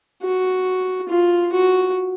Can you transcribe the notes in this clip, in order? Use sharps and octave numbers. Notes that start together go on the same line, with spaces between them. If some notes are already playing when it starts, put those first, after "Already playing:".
F#4
F4
F#4